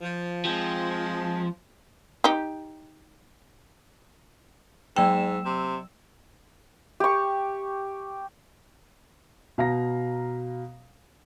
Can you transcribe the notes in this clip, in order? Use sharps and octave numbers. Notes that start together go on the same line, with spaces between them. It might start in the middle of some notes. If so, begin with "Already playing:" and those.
F3
F3 G#3 C4
D#4 G4
G#2 F#3 G5 E6 E7
C3
G4 C#6
B2 F5 A#5 A#6